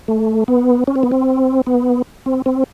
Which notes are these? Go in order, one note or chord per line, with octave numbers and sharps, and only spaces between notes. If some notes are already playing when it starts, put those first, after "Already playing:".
A3
B3
C#4
C4
B3
C4
B3
C4
C4